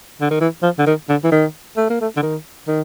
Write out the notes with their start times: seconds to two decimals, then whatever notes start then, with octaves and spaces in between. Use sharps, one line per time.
0.21 D3
0.30 D#3
0.41 E3
0.62 F3
0.78 D3
0.86 D#3
1.09 D3
1.24 E3
1.31 D#3
1.77 A3
1.90 A#3
2.01 A3
2.17 D3
2.22 D#3
2.67 D#3